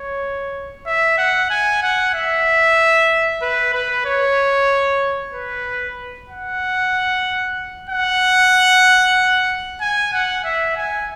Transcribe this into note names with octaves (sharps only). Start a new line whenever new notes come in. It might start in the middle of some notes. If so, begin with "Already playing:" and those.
Already playing: C#5
E5
F#5
G#5
F#5
E5
B4
B4
C#5
B4
F#5
F#5
G#5
F#5
E5
G#5